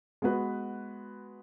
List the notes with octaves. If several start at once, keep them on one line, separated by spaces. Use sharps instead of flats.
G#3 B3 F#4 B4